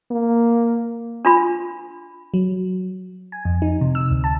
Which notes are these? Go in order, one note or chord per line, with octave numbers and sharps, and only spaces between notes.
A#3
D4 F4 B5
F#3
G#5
F2
D#4
C3
E6
D2
A5